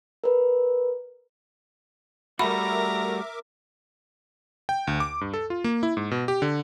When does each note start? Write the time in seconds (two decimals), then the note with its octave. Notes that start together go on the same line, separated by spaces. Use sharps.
0.24 A#4 B4
2.39 G3 A3 F#4 A#4 E5 A#5 B5 D6
4.69 G5
4.87 D2
5.00 D6
5.21 G2
5.34 A4
5.50 F4
5.64 A#3
5.83 E4
5.97 G#2
6.11 B2
6.28 G4
6.42 D3